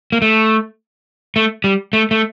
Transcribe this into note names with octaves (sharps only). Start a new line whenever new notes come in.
A#3
A3
A3
G3
A3
A3